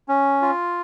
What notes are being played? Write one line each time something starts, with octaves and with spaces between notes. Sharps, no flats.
C#4
F4